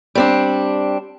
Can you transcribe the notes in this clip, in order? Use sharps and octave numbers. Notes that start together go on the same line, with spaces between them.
G3 C4 D4